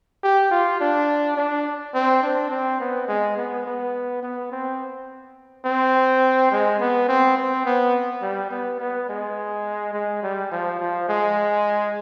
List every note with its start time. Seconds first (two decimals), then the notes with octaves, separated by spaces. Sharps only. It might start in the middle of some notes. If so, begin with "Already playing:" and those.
0.23 G4
0.51 F4
0.80 D4
1.37 D4
1.94 C4
2.23 D4
2.51 C4
2.80 B3
3.08 G#3
3.37 B3
3.65 B3
4.23 B3
4.52 C4
5.65 C4
6.52 G#3
6.80 B3
7.08 C4
7.37 C4
7.66 B3
8.22 G3
8.51 B3
8.80 B3
9.09 G#3
9.93 G#3
10.23 G3
10.52 F3
10.80 F3
11.09 G#3